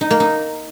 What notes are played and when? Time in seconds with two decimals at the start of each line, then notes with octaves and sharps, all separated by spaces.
0.01 D#4
0.10 A#3
0.20 D#4